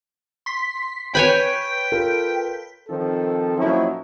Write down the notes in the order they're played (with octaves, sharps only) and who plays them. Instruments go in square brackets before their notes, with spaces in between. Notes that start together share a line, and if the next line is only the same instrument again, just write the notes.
[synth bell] C6 B6
[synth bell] B4 G6 [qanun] C#5 G#5 B5 [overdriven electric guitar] G5
[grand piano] F4 A4 A#4
[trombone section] D#3 F3 C4 A4
A#2 F3 F#3 C#4 D#4 E4